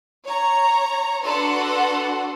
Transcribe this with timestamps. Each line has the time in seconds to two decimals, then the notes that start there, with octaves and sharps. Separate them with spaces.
0.25 C#5 A#5
1.24 D4 F#4 A4 B4 F#5 C6